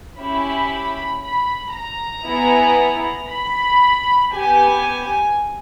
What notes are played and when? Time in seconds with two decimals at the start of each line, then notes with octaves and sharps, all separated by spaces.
0.19 C#4 E4 G4 B5
1.22 B5
1.75 A#5
2.27 B3 E4 G#4
3.30 B5
4.34 B3 G4 G#5